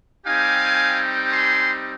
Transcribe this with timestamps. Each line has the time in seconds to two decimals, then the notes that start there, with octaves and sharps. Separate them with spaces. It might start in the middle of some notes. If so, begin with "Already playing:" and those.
0.25 G3 C4 D#4 G4 F5 G#5
1.31 G#5 C6